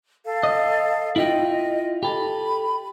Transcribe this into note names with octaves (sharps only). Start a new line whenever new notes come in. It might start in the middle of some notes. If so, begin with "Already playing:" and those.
A4 F5
D#5
E4 F4 D#5 G5
G4 A4 B5